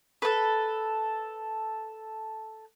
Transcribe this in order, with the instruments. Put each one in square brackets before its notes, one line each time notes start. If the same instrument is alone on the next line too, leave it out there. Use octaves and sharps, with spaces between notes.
[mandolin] A4 B4